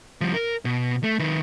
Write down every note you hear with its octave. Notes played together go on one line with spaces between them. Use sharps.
F3 G3
A#4
B2
A3
D#3 B4